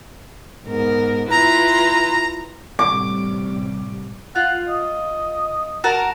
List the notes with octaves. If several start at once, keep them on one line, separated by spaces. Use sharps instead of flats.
G#2 B3 A#4
E4 F4 B4 A#5
A1 C3 G3 D6
F4 F#5
D#5
F#4 A#4 A5